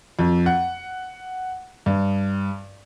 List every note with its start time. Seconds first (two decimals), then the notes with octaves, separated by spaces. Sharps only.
0.19 F2
0.46 F#5
1.86 G2